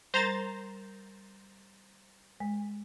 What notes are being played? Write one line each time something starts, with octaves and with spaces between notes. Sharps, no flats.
G3 A#4 C5 A#5 A6
G#3